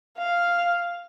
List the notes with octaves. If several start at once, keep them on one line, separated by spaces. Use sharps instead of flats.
F5